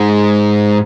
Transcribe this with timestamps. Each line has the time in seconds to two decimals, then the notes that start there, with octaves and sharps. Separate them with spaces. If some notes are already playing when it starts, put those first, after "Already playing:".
Already playing: G#2